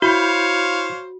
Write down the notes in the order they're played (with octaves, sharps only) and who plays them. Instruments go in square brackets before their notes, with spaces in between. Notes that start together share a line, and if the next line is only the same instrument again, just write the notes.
[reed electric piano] E4 B5 G6 [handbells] F#4 [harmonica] C5 C#5 F5